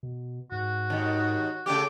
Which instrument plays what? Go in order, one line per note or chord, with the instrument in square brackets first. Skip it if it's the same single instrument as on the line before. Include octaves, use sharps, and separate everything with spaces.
[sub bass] B2
[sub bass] G#2 [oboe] F#4
[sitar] D#2 D#3
[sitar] C#3 A3 G4 [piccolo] D6